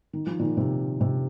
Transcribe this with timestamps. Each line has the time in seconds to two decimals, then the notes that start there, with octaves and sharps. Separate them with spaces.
0.13 D#3
0.27 F3
0.39 A#2 D#3
0.57 C3
1.01 C3